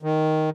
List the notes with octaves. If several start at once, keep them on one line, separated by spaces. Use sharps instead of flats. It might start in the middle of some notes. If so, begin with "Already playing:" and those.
D#3